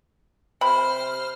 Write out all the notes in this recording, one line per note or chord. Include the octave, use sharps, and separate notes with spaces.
C3 C5 B5 F6